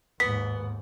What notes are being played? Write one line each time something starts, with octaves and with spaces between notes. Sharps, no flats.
D#2 G#2 B3 B6